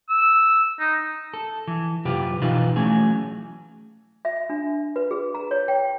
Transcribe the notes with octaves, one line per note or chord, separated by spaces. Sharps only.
E6
D#4
A4
E3
F#2 C3 F4 G4 B4
B2 E3 D#4 F4 B4
E3 F#3 A3 C#4 G#4
E5
D4
B4
G#4
A#5
C#5
G5